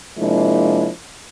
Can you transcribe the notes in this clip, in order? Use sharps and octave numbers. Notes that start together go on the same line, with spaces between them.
C3 F3 G#3 A#3 D4 E4